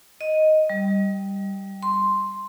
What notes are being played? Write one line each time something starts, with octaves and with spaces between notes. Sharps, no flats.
D#5
G3
C6